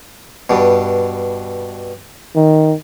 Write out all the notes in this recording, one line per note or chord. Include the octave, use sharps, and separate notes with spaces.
G2 B2
D#3